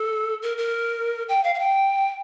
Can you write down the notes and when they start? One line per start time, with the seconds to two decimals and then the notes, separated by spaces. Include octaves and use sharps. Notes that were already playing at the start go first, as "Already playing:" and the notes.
Already playing: A4
0.42 A#4
0.58 A#4
1.29 G5
1.44 F5
1.55 F5
1.59 G5